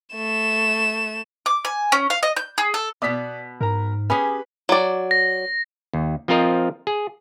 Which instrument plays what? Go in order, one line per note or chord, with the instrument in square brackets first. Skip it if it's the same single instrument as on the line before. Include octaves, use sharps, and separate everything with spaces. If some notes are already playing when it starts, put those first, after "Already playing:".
[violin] A3 E7
[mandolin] D6
G#5
C#4
F5
D#5
G6
G#4
A4
[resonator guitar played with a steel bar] B2 B3 [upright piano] D5 D#6 B6
[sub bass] G#2 [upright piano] A#4 A#5
[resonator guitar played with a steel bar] C#4 G4 G#4 [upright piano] B4
[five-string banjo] F#3 D5
[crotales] A#6
[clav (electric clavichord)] D#2
F3 C4 F4 A#4 D#5
G#4